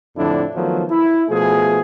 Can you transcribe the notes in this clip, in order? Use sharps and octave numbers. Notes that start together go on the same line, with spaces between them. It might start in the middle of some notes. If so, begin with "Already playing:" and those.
F2 A2 D3 D4 E4
D#3 F3 F#3 A3 B3
E4
B2 F3 A3 G#4